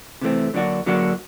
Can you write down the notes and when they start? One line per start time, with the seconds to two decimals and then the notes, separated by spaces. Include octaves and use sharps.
0.21 C3 E3 A3 C4
0.54 D3 F#3 A#3 D4 F#4
0.86 D3 F#3 A#3 D4 F#4